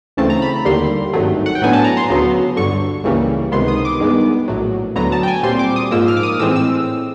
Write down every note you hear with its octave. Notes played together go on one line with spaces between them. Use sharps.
D2 C#3 E3 A3 C4 A5
A#5
B5
D#2 D3 G3 A#3 C6
G#1 G2 D#3 F#3 A3
F#5
G5
A2 F#3 B3 D4 G#5
A5
A#5
C6
D2 C#3 F#3 B3
G1 G2 D3 C#6
C#2 C#3 E3 G3 A#3
C#2 C3 D#3 G#3 B3 C6
D#6
D6
G2 D#3 G#3 B3
A#1 A2 F#3
D2 D3 F#3 B3 A#5
A5
G5
G#5
A#2 G3 C4 C6
D6
D#6
G#2 F3 A#3 E6
F6
D6
D#6
A2 E3 G#3 C4 E6
E6